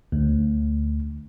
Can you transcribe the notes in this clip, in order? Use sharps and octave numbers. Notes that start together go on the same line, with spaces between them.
D2